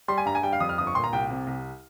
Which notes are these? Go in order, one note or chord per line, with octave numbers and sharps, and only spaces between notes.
G3 C6
G#5
G2 A#5
G#5
G3 G5
F5
F2 D#6
F6
G1 D#6
C#6
A#2 C6
A#5
C2 G5
C3
C2